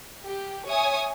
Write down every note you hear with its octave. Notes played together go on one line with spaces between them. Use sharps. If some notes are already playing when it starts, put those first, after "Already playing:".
G4
C#5 E5 G#5 D#6